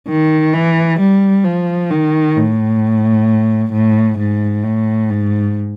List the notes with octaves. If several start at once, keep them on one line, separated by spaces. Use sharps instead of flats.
D#3
E3
G3
F3
D#3
A2
A2
G#2
A2
G#2